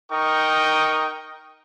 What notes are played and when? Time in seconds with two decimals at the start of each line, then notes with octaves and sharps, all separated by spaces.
0.12 D#4 A#4 G5 C#6 D#6